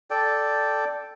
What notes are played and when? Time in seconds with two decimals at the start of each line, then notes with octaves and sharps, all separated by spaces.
0.11 A4 D5 G5